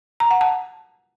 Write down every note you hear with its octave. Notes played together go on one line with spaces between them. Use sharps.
A#5
F#5
A5